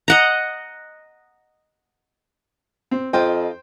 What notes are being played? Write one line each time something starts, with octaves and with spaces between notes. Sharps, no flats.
D#5 F#5 A#5
C4
F2 F4 C5 D#5 G5